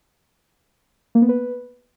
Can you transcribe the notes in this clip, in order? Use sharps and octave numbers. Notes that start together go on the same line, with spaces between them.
A#3
B3
B4